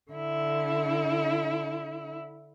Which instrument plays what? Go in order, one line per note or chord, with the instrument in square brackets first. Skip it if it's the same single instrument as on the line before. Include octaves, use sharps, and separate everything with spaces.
[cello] D3 E4